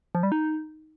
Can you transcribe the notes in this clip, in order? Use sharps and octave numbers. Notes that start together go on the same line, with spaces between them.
F3
G3
D#4